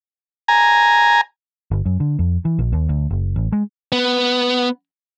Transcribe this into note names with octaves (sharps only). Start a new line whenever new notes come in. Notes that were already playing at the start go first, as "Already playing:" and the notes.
G#5 A#5
G1
F#2
D3
F2
E3
A#1
D#2
D2
F#1
A1
G#3
B3